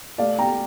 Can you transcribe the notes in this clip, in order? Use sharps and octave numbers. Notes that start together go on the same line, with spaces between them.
A3 D5 F5
G5 A#5